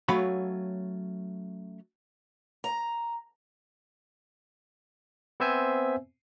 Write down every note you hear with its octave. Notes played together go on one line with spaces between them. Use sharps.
F#3 A3 C#4 C#5 F5 B5
A#5
B3 C4 C5 E5 G#5